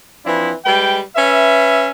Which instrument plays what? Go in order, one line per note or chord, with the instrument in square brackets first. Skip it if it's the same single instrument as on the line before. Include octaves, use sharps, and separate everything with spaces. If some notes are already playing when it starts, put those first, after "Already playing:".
[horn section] E3 F3 C4 D4 E4
G3 G#3 B4 G5
C#4 B4 E5